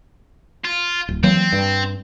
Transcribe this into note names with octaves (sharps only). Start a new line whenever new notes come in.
F4
D1
E3 F#3 A#3 C4
G2